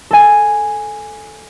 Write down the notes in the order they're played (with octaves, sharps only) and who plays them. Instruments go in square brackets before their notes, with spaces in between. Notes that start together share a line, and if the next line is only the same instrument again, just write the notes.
[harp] A4 G#5